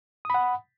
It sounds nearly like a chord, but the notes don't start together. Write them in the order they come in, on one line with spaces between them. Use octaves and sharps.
D#6 B5 F#5